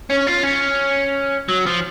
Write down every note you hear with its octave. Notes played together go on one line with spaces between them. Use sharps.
C#4
F4
C#4
F#3
F3